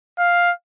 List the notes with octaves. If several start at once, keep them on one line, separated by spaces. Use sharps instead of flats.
F5